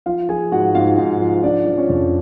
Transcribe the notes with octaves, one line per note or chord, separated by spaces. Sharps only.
F3 F4 F5
F3 G#4 G#5
G#2 F#4 F#5
G#2 F4 F5
G#2
F3
F3 D4 D5
F3
C#4 C#5
F2